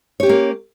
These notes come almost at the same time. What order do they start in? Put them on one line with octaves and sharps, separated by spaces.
C#5 G4 C#4 A#3